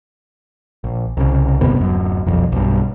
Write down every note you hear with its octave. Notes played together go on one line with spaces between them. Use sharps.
A#1
C2 C#3
G1 D#2 C3 B3
D1 F#2
D#1 B1 F2
B1 G2